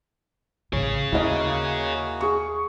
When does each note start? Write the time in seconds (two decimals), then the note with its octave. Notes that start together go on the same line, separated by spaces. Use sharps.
0.73 A1 C#3 G#4 C#5
1.12 D#2 A#3 E4 F#4 D#5
2.21 G#4 C#6